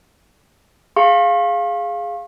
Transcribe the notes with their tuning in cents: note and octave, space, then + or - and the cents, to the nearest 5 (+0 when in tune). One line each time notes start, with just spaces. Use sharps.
G#4 +0 F5 +0 C#6 -45